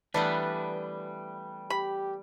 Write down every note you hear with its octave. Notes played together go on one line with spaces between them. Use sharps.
E3 G3 A3 B3 D4 B4
G4 B5